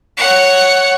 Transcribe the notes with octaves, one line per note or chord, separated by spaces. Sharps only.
C#5 F#5